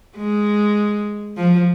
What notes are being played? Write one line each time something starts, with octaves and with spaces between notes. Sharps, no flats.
G#3
F3